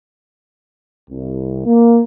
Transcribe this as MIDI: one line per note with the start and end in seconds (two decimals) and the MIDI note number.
1.10 1.63 36
1.66 2.02 58